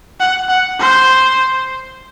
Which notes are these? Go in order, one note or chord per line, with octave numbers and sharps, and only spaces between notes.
F#5
F#5
C5